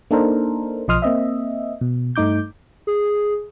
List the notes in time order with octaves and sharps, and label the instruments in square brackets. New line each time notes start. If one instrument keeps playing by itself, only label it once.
[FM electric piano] A#3 D4 D#4 A4 A#4 C5
B1 F3 D#5 C6 D#6 F6
A#3 C4 D#5 E5
B2
G2 A3 D#4 D6 G6
[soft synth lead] G#4